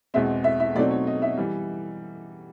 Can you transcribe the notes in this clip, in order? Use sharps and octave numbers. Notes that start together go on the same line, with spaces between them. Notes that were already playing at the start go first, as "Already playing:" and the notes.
E2 B2 G#3 C4 E5
E5
E5
B2 F#3 A3 C4 D#4 D5
C#5
D#5
E5
E3 G3